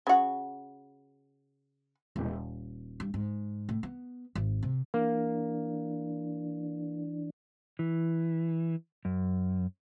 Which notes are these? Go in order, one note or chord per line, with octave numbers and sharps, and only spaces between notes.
C#3 F#4
D#1
G2
G#2
A2
B3
G#1
C3
E3 A#3 D4
E3
F#2